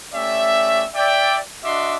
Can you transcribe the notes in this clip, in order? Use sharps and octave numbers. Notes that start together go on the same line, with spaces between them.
A3 C#4 G4 D5 E5
D5 E5 G5
D4 F#4 D#5 E5 C6 D6